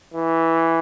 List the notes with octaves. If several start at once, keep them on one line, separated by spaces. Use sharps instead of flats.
E3